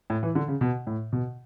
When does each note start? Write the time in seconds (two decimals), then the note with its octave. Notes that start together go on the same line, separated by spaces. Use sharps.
0.10 A2
0.23 E3
0.35 D3
0.48 C#3
0.61 B2
0.87 A2
1.12 B2